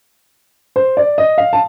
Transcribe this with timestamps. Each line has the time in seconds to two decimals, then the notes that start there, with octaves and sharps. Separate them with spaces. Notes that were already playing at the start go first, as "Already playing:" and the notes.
0.76 C5
0.97 D5
1.18 D#5
1.38 F5
1.53 A5